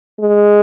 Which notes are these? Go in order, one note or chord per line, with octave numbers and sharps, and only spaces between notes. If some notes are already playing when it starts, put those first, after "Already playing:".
G#3